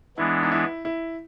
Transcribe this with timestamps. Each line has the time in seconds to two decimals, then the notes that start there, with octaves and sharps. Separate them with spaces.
0.17 E3 G#3 B3 D4 E4
0.43 D#4
0.52 E4
0.85 E4